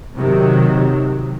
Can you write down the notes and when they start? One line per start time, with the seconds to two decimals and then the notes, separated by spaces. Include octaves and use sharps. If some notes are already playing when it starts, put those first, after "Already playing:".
0.18 C3 D#3 F#3